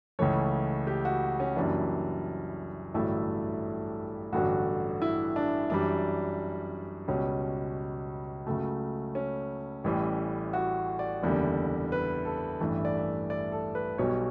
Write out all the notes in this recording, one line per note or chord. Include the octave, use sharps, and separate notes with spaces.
C#2 C#3 E3 A3 C#5
G4
F#4
C#4
F#1 F#2 E3 G3 D4
A1 G2 D3 F#3 A3 E4
A1 G2 D3 F#3 F#4
E4
D4
F#2 E3 G3 D4
C#2 B2 G3 C#4
C#2 C#3 F#3 A3
C#4
A1 A2 E3 G3
F#4
D5
F#1 E2 D3 G3
B4
A4
A1 G2 E3 A3
E5
D5
E5
D5
A4
B4
B1 B2 G3 C#5